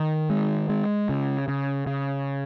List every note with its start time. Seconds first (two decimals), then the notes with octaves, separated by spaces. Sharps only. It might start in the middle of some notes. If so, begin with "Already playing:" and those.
Already playing: D#3
0.30 G#3
0.69 G#3
1.09 C#3
1.48 C#3
1.87 C#3